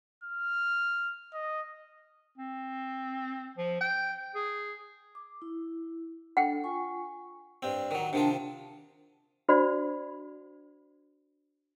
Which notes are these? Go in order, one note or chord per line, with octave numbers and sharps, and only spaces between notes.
F6
D#5
C4
F3
G5
G#4
D6
E4
D4 A4 F#5 G5
F4 G#5 C#6
G2 C4
D#3 F#3
C3 D#3 D4 F4
D4 F#4 C5 D5 F#5 B5